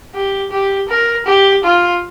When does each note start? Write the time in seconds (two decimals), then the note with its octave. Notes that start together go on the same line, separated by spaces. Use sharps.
0.15 G4
0.51 G4
0.89 A#4
1.26 G4
1.64 F4